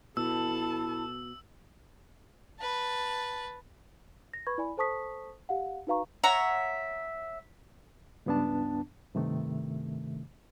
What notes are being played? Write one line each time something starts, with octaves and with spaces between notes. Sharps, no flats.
B2 E4 A4 A5 E6
B4 A5
A#6
B4 B5 C#6 G#6
E4 D5 G#5 B5
A4 C5 A5 C#6 D#6 B6
G4 F5 F#5
D#4 F#4 B4 F5 A#5 C#6
C#5 E5 F#5 A#5
C#2 G2 B3 D4 A5
G2 C3 D#3 A3